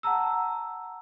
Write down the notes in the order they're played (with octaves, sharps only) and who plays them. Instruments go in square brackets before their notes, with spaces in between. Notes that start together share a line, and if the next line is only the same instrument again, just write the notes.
[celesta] F#5 A5 A#5 E6